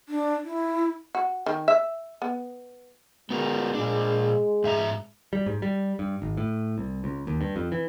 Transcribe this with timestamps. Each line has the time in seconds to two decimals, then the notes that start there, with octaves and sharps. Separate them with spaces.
0.09 D4
0.45 E4
1.15 F#4
1.46 D#3
1.68 E5
2.22 B3
3.30 G#3 B3 F#4 A#4
3.75 A#2 D4
4.64 G#2 E5 A#5
5.33 G3
5.46 G#2
5.62 G3
5.99 G2
6.22 G#1
6.37 A2
6.78 C2
7.04 C#2
7.27 D#2
7.41 G2
7.56 F2
7.72 E3